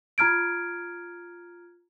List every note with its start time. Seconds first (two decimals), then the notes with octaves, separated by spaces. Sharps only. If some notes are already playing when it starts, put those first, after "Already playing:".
0.18 F4 A#5 F6 G#6 D7